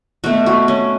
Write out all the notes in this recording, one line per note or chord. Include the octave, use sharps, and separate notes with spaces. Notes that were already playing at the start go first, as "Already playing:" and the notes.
B2 A3 F#4
F#4
C#4